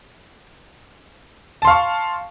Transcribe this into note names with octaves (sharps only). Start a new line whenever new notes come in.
F5 A5 C6 C#6